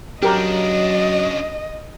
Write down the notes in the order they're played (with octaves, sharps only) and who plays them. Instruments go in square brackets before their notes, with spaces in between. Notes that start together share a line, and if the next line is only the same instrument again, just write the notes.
[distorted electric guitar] C#3 D4 [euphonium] F#3 [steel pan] G4 A#4 A#5 [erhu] D#5